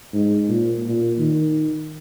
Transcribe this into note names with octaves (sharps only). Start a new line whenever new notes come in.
G#2
A#2
A#2
D#3